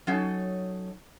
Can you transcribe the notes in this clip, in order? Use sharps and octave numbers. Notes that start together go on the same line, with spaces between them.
F#3 C#4 D#4 A4